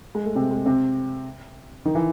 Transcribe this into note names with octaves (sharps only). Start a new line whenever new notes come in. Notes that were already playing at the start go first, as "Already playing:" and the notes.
G#3
A3
C3 C4
G#3
C3 C4
D#3 D#4
E3 E4